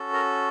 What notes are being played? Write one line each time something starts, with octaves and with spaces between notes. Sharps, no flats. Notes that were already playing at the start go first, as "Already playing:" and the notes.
Already playing: C#4 F#4 A4
A#4